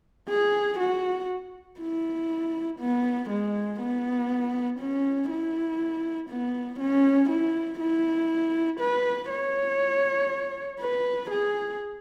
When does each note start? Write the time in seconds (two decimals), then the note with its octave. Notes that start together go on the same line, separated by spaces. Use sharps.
0.29 G#4
0.80 F#4
1.80 E4
2.80 B3
3.30 G#3
3.80 B3
4.80 C#4
5.31 E4
6.30 B3
6.80 C#4
7.30 E4
7.80 E4
8.80 B4
9.30 C#5
10.80 B4
11.31 G#4